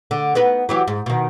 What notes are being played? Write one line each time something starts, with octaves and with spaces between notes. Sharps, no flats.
D3
B3 D#4 B4
E3 F#3 G4
G#2
B2 D#3